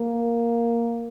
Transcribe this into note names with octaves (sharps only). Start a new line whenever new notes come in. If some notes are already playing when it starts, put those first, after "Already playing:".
Already playing: A#3